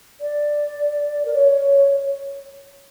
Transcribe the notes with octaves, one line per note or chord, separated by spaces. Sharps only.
D5
A#4
C#5